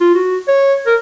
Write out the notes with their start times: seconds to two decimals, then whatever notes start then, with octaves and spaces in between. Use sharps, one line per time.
0.01 F4
0.15 F#4
0.48 C#5
0.87 A#4